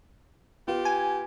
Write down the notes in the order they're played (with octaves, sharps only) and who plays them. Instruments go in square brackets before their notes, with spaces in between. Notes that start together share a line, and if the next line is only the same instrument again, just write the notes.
[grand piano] B3 F4 [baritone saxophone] G4
[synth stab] G#5